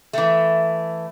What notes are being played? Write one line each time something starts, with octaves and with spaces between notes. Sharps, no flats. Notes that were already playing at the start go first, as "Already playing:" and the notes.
E3 A3